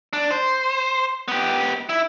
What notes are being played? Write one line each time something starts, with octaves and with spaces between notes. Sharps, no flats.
D4
C5
B3 G4
E4